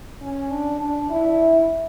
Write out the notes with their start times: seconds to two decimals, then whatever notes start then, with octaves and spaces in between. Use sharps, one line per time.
0.21 C#4
0.51 D4
0.81 D4
1.10 E4